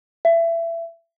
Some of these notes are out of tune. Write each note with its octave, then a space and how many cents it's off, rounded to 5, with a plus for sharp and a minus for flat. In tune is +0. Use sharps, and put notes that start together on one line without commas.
E5 +25